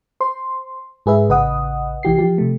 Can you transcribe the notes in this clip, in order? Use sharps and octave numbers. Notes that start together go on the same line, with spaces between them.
C5 C6
G#2 G#4 B4 E5
A1 C#3 B4 D#5 F#5 D#6
C2 E3 G4 C7
F3 G4
C3 A3